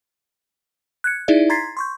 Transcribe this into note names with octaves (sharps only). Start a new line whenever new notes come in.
F#6 G#6 C#7
D#4 E4 G#4 D5 E5
A#5 C6 G#6 A6 B6 C7
C6 C#6 G6